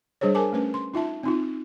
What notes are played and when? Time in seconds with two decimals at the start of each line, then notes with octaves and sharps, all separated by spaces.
0.21 G3 D4 G#4 C5 C#5
0.35 G#4 A#4 G#5 A5 D6
0.53 A3 C#4 B4
0.74 C6
0.94 D#4 F4 E5 A5
1.23 C4 D#4 F4